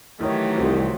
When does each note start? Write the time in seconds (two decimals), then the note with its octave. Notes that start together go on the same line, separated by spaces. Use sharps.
0.21 D#3 E3 F#3 A3 E4 G4 C#5
0.58 C2 F4 F#4 C5